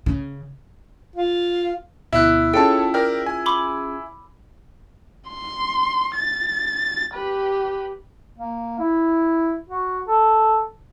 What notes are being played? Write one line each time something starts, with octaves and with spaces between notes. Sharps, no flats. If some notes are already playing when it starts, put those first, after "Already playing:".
C#3
F4
D2 B2 E4 E5 F#6
C#4 F4 G#4 A4 C#5 G5 A5 E6
A#4 D5 G5 F6
G#5
B5 C6 D6
C6
A6
G4 B4
A#3
E4
F#4
A4